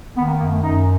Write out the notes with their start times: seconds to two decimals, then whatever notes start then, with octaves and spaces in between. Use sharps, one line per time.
0.15 D#3 B3
0.27 A#3
0.38 F#2 A#3
0.50 A3
0.61 F#2 D#4